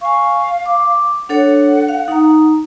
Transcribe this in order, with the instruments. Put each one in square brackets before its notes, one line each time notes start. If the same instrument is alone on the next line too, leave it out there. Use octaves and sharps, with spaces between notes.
[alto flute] F5 [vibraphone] G#5 C#6
[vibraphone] D6
[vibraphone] D4 A4 C#5 [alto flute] F#5
[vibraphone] F5
D#4 A#5